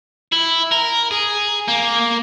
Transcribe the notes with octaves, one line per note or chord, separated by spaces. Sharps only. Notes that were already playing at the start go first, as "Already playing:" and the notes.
E4
A#4
G#4
A#3